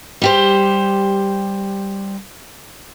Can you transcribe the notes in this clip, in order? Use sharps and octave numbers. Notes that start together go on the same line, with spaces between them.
G3 G4 C5